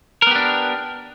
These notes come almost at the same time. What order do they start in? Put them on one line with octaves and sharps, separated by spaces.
A#4 B3 G4 D4